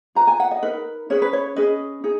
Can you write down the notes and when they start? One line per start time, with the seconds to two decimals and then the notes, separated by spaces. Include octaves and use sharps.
0.15 F4 B4 A#5
0.27 G#5
0.40 F#5
0.51 D#5
0.63 D#4 A#4 B4
1.10 C#4 G#4 B4 C#5
1.22 B4
1.33 C#5
1.56 C#4 G#4 B4 D#5
2.04 D#4 G#4